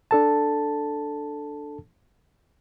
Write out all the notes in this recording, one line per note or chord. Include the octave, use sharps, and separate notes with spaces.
D4 A4 A5